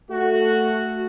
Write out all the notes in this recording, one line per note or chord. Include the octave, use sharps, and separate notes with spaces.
A3 F#4